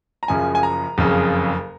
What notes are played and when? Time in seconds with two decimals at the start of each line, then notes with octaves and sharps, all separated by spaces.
0.23 A#5
0.28 F#1 F#2 C#3 F3 G#5
0.55 G#5
0.63 A#5
0.98 F#1 F2 C#3